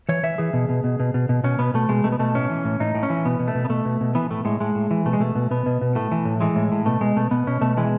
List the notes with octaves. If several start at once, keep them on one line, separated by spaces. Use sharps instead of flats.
E3 C#5
E3 E5
E3 G#4
B2
B2
B2
B2
B2
B2
B2 C#4
B2 B3
B2 A3
B2 G#3
B2 A3
B3
B2 A3
A2 C#4
E3
A2
A2 D#4
A2
C#4
E3
B2 B3
B2
A3
B2
B3
B2 A3
B2
B2
E3 B3
A2 A3
A2 G#3
A2 G#3
A2
E3
B2 A3
G#3
B2 A3
B2
B2 B3
B2
B2
A2 A3
E3
A2
E3 G#3
A2
A2
B2 A3
B2 G#3
B2 A3
B2 B3
B2 C#4
B2 A3
E3 G#3